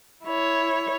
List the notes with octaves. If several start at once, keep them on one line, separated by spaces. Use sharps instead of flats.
E4 C#5